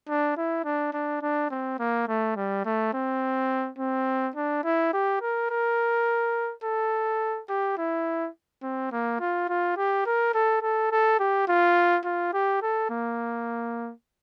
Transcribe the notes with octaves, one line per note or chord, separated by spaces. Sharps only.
D4
E4
D4
D4
D4
C4
A#3
A3
G3
A3
C4
C4
D4
E4
G4
A#4
A#4
A4
G4
E4
C4
A#3
F4
F4
G4
A#4
A4
A4
A4
G4
F4
F4
G4
A4
A#3